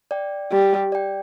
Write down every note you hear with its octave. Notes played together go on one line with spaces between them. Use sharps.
D5 G5
G3 G4
D5 G5